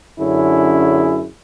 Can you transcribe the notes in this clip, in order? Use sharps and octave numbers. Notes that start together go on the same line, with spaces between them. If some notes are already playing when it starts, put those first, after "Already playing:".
F#2 D3 C#4 E4 G#4